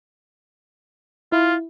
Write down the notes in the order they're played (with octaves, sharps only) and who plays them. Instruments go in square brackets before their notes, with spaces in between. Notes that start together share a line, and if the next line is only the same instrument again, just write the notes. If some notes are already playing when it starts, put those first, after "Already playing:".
[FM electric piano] E4 [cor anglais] F4